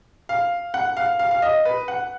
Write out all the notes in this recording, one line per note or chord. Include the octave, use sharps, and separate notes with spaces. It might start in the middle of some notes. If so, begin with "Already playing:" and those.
F5
F#5
F5
F5
F5
D#5
B4
F#5